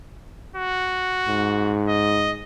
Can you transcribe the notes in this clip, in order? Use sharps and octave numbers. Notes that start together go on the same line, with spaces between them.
F#4
G#2
D#5